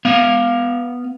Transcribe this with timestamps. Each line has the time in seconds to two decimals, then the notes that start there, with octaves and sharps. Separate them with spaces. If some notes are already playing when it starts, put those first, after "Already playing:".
0.05 B3 F5